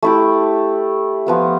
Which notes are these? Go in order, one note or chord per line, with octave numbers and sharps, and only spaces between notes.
A3 E4 G4
F3 B3 F4